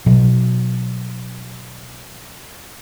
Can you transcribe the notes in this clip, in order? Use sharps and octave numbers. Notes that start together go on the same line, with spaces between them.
B2 F#3